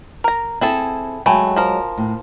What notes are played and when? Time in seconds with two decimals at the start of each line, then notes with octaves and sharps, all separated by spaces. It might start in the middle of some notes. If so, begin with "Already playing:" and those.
0.24 A#4 A#5
0.61 C4 E4 G#4 A4
1.26 F#3 G#3 A3 G5 G#5 B5
1.56 F3 A#4
1.98 A2